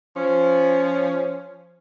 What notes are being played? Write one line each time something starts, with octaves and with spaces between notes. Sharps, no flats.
F3 C#4